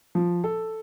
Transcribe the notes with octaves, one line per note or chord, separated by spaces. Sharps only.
F3
A4